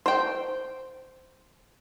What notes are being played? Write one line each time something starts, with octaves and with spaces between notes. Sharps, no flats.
C5 G5